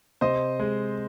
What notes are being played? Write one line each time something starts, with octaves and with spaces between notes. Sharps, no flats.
C3 C5 D#5
G#3